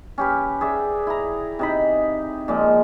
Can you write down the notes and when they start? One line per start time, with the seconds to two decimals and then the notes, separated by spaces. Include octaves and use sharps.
0.18 C#4 G4 B4
0.61 G#4 D5 E5
1.07 E4 A#5
1.59 C3 D#4 B5
2.48 A#2 F3 G#3